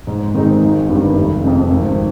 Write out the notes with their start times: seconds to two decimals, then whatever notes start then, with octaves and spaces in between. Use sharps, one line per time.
0.07 G#2
0.34 D#3 G#3 C4 D#4
0.62 G#1
0.89 G2 D#3 G3
1.16 F1
1.43 F2 C#3
1.71 G#1